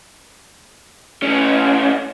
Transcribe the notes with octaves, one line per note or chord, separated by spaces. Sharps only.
A2 C#4